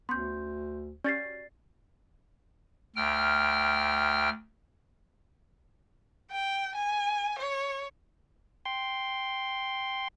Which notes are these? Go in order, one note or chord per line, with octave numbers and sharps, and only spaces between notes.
D2 B3 C#4 C6 G6
C#4 F#4 G4 D5 A6 C7
D2 G5 F6
G5
G#5
C#5
G5 C6